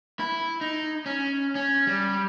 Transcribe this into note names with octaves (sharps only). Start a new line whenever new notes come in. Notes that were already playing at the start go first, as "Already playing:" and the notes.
E4
D#4
C#4
C#4
G3